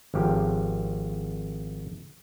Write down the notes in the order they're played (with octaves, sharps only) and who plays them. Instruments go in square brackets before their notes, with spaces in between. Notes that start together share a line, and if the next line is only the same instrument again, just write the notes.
[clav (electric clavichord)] G#1 F3 G4